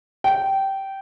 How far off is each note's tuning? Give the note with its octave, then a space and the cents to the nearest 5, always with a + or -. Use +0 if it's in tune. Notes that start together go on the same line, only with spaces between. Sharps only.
G5 -15